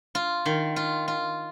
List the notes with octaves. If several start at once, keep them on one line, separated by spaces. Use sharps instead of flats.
F4
D#3
F4
F4